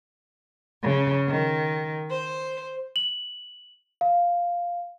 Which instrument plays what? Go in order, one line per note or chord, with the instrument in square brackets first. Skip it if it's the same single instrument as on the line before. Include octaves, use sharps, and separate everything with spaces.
[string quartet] C#3
D#3
C5
[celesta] F#7
F5